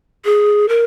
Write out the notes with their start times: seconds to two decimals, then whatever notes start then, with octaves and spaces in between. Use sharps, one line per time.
0.25 G#4
0.69 A#4